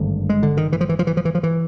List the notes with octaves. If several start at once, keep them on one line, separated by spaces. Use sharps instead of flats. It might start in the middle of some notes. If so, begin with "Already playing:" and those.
Already playing: G#1 G2 D3 A3
G#3
D3
D#3
E3
F3
E3
F3
E3
F3
E3
F3
E3